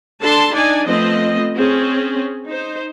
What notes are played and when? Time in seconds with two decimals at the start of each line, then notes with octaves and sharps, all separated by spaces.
0.21 D4 A4 A5 C6
0.52 D4 D#4 D5 G#5
0.85 F3 A3 B3 C4 C5 D#5
1.56 C4 C#4 G#4
2.45 D#4 C5